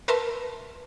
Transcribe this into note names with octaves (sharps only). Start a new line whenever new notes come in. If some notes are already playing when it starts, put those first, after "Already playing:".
A#4 B4 E5 A5 C6